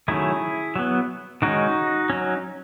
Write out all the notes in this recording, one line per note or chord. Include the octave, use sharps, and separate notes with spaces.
D#3 F#3 A3 C#4 E4 G#4
F#3 B3
D#3 G#3 C#4 D#4 F#4
F#3 C#4